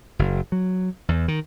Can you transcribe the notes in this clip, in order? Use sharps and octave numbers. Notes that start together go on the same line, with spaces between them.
F#1
F#3
E2
D#3